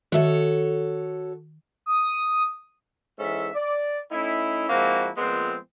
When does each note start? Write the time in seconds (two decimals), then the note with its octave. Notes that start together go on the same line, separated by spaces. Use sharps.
0.12 D#3 F#4 A4 C#5 E5
1.86 D#6
3.19 G#2 E3 C#4 A4 E5
3.54 D5
4.11 A3 C#4 D#4 E4
4.69 F3 G#3 A#3 C4 E4 F#4
5.17 A#2 F3 G#3 B3 C4